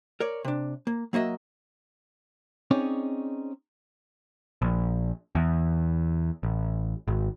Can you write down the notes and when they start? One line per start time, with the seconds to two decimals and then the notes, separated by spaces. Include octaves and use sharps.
0.20 A#4 C#5 D5
0.44 C3 D4
0.87 A#3
1.13 F#3 A#3 F#4 D#5 E5
2.71 C4 C#4 D#4 G#4 C#5 D5
4.62 A#1
5.35 E2
6.43 A1
7.08 G#1